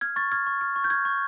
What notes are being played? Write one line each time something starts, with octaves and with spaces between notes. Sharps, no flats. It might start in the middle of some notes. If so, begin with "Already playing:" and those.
F6 G#6
C#6 A6
F6 G#6
C#6
F6
C#6
G6
F6 G#6
C#6